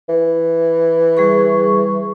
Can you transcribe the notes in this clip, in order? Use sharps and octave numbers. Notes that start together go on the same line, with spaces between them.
E3
G3 G#4 C#6